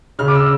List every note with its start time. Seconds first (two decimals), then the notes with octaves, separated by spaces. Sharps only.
0.19 C#3 F6
0.28 D6
0.35 E6